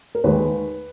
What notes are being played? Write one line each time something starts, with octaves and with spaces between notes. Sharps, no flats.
A#4
D#2 D#3 G#3 B4